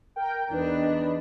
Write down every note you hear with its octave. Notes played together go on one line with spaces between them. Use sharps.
A#4 G5
E2 D4 D#4 B4